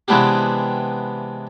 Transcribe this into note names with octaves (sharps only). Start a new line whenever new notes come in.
C3 E3 G#3 B3 D4 G4